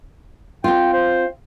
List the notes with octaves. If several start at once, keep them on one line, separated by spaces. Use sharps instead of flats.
C4 F4 G5
C5